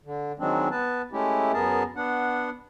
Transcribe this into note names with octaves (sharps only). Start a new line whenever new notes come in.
D3
D#3 F#3 G#3 C4 D4
B3 B4 A5
G#3 A3 C#4 E4 G4
F#2 B3 G#4 A#4 A5
B3 D4 F#5